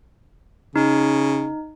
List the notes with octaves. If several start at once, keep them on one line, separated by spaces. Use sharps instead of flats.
C#3 D#4